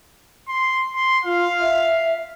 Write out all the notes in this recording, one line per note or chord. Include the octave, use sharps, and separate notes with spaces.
C6
C6
F4 F5
E5